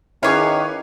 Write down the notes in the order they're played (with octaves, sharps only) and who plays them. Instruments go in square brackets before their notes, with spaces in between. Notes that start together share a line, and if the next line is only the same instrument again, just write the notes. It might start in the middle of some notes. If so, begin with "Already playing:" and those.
[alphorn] D#3 [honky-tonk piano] C#4 B4 D6 [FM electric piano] E4 G#4 [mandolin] C#5 F5